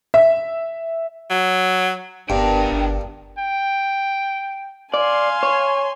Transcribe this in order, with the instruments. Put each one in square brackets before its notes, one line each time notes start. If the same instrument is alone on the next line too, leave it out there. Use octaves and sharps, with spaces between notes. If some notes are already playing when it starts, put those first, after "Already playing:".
[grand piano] E5
[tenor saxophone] F#3
[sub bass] F#1 [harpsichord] G2 [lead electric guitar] D3 G5 [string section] B3 D4 A#4
[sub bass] G1
[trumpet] G5
[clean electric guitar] D5 [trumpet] F5 [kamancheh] G#5 C6
[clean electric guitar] C#5